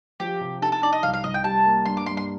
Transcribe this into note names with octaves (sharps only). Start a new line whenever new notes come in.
F3 G4
C3
D#4 A4
A4
D#4 D5
D#5
C2 F5
F5
C2 D#5
G5
G3 A5
A#3
G2 C6
D6
G2 C6
C6